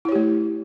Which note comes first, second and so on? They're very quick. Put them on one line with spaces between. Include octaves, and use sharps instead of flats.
E4 C#5 G4 A3